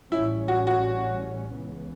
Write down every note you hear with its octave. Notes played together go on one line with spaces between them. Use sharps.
A1 A2 G3 C#4 E4
F#4
F#4
C#2 C#3 E3 B3